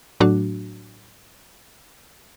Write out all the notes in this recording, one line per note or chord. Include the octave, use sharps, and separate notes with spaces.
A2 F#3 A3 D4 F#4